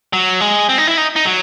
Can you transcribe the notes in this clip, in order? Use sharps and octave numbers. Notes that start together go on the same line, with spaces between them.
F#3
G#3
C4
D#4
E4
D#4
D#4
F#3